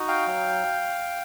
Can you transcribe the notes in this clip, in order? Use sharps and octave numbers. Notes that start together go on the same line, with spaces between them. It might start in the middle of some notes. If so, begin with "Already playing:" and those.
Already playing: D#4 F#4
F5 G5
F#3